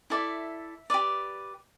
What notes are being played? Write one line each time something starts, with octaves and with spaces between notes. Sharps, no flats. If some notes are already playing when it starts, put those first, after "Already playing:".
E4 A4 D5 E5
G4 B4 D5